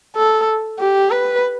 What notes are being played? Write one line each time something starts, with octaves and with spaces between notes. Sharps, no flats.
A4
G4
B4